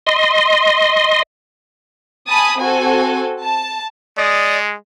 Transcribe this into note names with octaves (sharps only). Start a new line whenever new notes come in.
D#5 C6
G#5 A5 B5 D#6
C4 F#4 A4 G#5
A5
G#3 D5 D#5